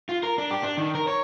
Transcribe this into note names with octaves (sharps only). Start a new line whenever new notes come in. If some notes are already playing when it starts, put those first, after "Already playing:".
F4
A#4
D4
G4
D4
D#3
A#4
C#5